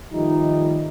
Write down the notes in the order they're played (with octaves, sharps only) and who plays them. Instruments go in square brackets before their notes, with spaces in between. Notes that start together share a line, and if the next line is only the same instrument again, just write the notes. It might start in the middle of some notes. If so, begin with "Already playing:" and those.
[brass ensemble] D#3 F3 G3 A3 D#4